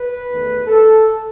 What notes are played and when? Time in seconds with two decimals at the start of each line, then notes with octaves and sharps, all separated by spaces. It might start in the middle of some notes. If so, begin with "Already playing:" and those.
Already playing: B4
0.29 E2 D#3 A3
0.67 A4